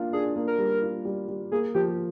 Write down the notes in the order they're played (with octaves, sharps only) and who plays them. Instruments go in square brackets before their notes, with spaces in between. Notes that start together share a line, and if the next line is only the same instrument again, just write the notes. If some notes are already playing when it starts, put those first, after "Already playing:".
Already playing: [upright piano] A#3 D4 F4
[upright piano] D4 [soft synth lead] G#4
[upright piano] A#3
[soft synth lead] A#4
[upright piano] G3
F4
G3
G3
[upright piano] A#3 [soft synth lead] G#4
[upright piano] F3 [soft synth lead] G4